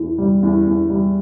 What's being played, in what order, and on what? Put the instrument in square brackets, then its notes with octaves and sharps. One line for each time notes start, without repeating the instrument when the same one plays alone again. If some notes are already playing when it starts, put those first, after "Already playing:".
Already playing: [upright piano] E2
G3
E2
E2
G3